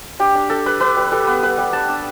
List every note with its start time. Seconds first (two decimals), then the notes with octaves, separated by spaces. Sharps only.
0.20 D4 G4
0.35 D4
0.50 D4 A4
0.66 G3 B4
0.80 D4 B4
0.96 G3
1.12 G3 A4
1.27 B3 B4
1.43 G3 B4
1.58 G3
1.73 D4 A5
1.88 D4